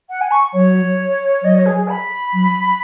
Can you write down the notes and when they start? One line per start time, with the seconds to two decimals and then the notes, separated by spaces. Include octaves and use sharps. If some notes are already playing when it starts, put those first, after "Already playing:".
0.09 F#5
0.21 G#5
0.31 C#6
0.53 F#3 C#5
1.43 F#3 D#5
1.55 C#5
1.65 G#4
1.76 G#4
1.88 B5
2.34 F#3